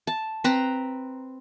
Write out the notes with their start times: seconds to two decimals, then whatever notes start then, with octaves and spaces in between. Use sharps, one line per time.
0.07 A5
0.44 C4 B4 A#5